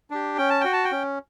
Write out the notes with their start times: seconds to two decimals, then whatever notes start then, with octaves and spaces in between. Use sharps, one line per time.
0.11 D4 G4
0.38 C#4 G5
0.50 A5
0.61 F#4 G5
0.73 A5
0.85 G5
0.92 C#4